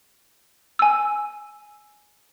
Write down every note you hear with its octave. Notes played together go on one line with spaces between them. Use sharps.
G#5 E6